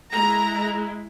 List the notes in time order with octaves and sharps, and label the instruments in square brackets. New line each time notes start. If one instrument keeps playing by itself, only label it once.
[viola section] G#3 E4 A#5